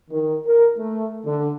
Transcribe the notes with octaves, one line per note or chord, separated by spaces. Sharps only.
D#3
A#4
A3
D3